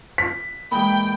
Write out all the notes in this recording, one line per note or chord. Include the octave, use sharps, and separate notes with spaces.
B6
A#2 E3 G#3 G5 B5